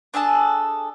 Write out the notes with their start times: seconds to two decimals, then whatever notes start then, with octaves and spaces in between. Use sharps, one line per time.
0.14 D4 G#4 A4 A5